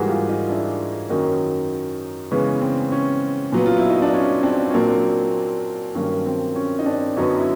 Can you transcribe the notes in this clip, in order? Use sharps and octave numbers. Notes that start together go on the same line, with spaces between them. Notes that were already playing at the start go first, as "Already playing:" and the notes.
Already playing: G#2 E3 G3 A#3 F#4 G#4
F4 G4
D#4 F4
D4 E4
F#2 D#3 F#3 A#3 C#4 D#4
C#3 E3 G#3 B3 C#4
C4
C#4
A#2 F#3 B3
F4
E4
D#4
D4
C#4
C4 D4
C#4
A#2 F#3 A#3 C4 D4
G2 D#3 F#3 A#3 C#4
C4
C#4
D#4
C4 D4
F#2 D3 F#3 B3 C#4 D#4
E4